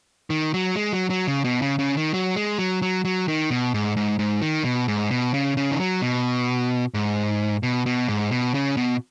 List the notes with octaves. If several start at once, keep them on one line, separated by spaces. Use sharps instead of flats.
D#3
F#3
G#3
F#3
F#3
C#3
B2
C#3
C#3
D#3
F#3
G#3
F#3
F#3
F#3
D#3
B2
G#2
G#2
G#2
D#3
B2
G#2
B2
C#3
C#3
D#3
F#3
B2
G#2
B2
B2
G#2
B2
C#3
B2